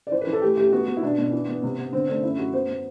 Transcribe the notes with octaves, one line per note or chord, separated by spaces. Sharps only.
D5
E3 C5
B4
E3
A4
A3 G4
A3 G4
G4
B3 F#4
B3
E4
B2 D4
B2
E3
B3
C3
B3
D3 C4
A3 D4
F#2 E4
F#2 F#4
B3 C5
B3